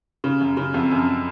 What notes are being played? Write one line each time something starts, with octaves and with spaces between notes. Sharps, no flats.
C#3
F#2
C#3
F2
F#2